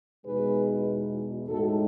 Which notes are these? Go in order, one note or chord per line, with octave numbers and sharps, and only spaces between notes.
E2 B2 G#3 D#4 G#4 B4
A2 G#3 D#4 F#4 A4